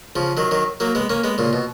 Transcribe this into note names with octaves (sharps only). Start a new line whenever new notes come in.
C#3 F3
D#3 F#3
D#3 F#3
F#3 A#3
G#3 B3
A#3 C#4
G#3 B3
A#2 C#3
B2